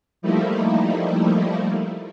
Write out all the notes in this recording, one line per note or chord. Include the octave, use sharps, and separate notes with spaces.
F3 G3 A3 A#3 D#4 E4